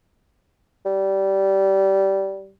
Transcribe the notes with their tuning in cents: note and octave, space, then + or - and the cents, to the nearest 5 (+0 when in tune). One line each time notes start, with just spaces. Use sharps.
G3 -15